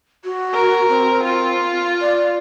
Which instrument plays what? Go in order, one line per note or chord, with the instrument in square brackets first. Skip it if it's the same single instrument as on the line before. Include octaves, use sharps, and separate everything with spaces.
[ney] F#4
[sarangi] A#4
[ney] C4
[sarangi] F4
[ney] D5